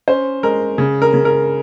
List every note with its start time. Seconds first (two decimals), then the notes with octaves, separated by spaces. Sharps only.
0.08 C#4 C5
0.43 G#3 A#4
0.78 C#3
1.02 A#4
1.14 C#3
1.25 A#4